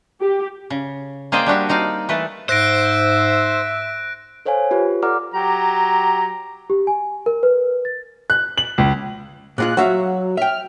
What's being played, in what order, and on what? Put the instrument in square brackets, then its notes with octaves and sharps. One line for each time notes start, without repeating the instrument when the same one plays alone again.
[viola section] G4
[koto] C#3
A#3 G#4 C5 D5 D#5 G5
G3 D4 F#4 G4
C4 D#4 D5 F5
E3 A3 A4 B4
[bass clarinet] G#2 [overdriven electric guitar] C5 [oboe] E5 [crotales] F#6 A#6 D7
[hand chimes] A4 C5 C#5 F5 G#5
F4 G4 B4
A4 D5 F#5 A#5 D6 F6
[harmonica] F#3 G4 A#5
[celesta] G4
G#5
A#4
B4
A6
[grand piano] F#6
F#7
C#2
[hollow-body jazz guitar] A#2 G#3 F4 [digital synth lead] F#6
[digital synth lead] F#3 [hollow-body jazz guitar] F#4 E5 F5
[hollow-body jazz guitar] E5 G5 [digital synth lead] F6